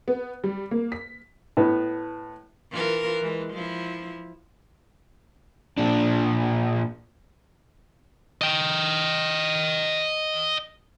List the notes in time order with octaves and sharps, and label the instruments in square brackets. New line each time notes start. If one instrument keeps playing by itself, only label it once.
[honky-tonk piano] B3
G3
A#3
B6
[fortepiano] A2 B3
[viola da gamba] E3 F4 A#4
E3 G#3
F3 E4
[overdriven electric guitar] A#2 D4
[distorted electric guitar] D#5 G5